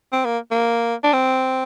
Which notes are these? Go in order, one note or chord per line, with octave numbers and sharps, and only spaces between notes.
C4
A#3
A#3
D4
C4